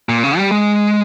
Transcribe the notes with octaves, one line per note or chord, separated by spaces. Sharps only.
A#2
C#3
G3
G#3